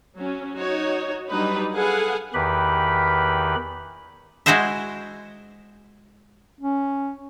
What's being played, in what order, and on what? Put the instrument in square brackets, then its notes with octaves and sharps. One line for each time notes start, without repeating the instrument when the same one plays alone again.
[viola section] F#3 C#4
D#4 F#4 C#5
F#3 G3 D4 D#4 B4
G#4 A4 B4 F5 F#5 G#5
[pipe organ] E2 D#3 G4 B4 B5
[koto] G#3 E4 F#4 G#4 C5 E5
[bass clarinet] C#4